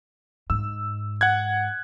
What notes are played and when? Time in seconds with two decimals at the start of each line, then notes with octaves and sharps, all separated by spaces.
0.50 G#2 E6
1.21 F#5 F#6 G#6